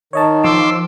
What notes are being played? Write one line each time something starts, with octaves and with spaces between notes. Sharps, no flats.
D#3 C#5 D#5 A5
F3 C6 D6 E6